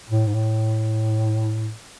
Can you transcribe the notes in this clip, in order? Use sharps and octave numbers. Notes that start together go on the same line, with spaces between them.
A2
G#2
A2